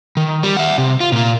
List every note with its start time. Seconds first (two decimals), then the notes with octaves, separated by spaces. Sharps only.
0.17 D#3
0.43 G3
0.57 E5 F#5
0.78 C3
1.00 F4
1.12 A#2 A#3